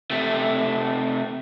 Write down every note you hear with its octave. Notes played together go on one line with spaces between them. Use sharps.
C3 A3